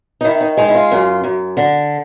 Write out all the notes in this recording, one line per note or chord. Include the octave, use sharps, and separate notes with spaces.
D#4
D#3 E4
D#4
G#3 D#4
E4
F4
F#2
F#2
D3